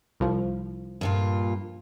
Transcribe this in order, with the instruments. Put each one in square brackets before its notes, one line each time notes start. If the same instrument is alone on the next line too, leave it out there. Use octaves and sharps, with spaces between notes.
[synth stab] C2 F3
[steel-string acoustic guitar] G2 A#2 F4